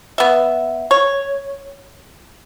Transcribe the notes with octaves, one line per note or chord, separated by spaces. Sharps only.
B3 E5
C#5